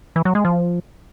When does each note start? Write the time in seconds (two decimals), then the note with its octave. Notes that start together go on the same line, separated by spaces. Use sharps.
0.16 E3
0.25 F#3
0.35 G#3
0.45 F3